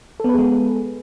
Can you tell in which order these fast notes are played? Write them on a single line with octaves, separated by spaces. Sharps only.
A4 B3 B4 G#4 G#3